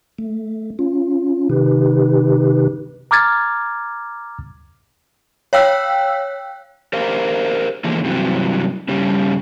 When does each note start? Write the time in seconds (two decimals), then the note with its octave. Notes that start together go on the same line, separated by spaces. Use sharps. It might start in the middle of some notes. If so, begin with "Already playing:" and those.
0.19 A3
0.79 C#4 F4
1.50 C3 D#3 D#4 G4 B4
3.11 A#5 D6 F6 G#6 A6
5.53 C#5 F5 G5 E6 F#6 B6
6.93 G4 A#4 C5 F5
7.84 D3 E3 F3 G#3 A#3
8.04 G2 C3 E3 F#3
8.88 G2 C#3 G3